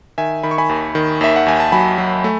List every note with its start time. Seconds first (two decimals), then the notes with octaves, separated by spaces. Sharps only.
0.18 D#3 E5 G#5
0.43 D#3 B5
0.51 C#6
0.58 G#5 B5
0.69 D#2
0.95 D#3
1.21 D#2 E5
1.36 F#5
1.46 D#2 G#5
1.60 A5
1.72 F#3 G#5 B5
1.98 F#3
2.24 A3